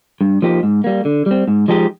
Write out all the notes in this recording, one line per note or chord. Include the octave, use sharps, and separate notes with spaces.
G2
F3 A#3 D#4 G4
G#2
G3 A#3
D3
G3 C4
G#2
F3 G#3 D#4 G4